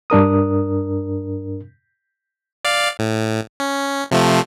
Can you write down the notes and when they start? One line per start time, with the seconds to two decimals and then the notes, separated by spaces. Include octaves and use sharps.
0.10 G2 D4 A#4 D#6
2.65 D5 F5
2.99 A2
3.60 C#4
4.11 C3 F3 A3